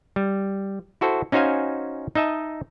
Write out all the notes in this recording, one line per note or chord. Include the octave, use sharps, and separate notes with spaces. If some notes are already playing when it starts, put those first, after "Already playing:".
G3
E4 F#4 A4 C5
C#4 D#4 F#4 C5 F5 G#5
D#4 D#5 E5 A5